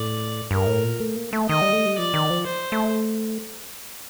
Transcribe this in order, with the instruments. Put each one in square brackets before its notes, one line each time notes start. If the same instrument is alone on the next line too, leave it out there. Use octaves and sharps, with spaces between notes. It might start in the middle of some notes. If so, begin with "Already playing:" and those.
Already playing: [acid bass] A2 [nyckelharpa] D5
[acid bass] G2 [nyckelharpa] A#4
[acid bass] A2
A#2
A3
A#3
A3
[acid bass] D#3 [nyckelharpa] D#5
[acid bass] G3
A3
G3
[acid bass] F3 [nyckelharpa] D5
[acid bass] D#3
F3
[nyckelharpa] C5
[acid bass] A3